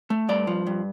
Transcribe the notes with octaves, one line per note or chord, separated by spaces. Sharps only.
A3
G2 D5
F3
G2